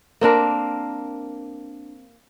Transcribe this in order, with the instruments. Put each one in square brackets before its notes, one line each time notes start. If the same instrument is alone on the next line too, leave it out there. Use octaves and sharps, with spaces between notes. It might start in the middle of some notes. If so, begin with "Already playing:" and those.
[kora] A#3 C4 D4 A#4